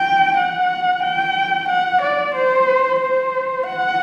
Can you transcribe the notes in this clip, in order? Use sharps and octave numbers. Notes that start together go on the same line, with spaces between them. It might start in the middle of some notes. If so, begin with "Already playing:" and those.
Already playing: G5
F#5
G5
F#5
D5
C5
C5
F#5